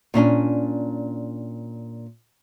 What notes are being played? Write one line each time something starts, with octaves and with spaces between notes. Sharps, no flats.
A#2 C#4 D4 G#5